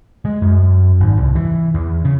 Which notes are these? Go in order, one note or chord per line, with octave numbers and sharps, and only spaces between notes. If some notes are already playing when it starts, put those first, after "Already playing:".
G#3
F#2
G#1
C2
E3
E2
C#3